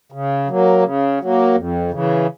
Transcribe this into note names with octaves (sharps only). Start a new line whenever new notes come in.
C#3
F#3 A#3
C#3
F#3 A#3
F2
C#3 E3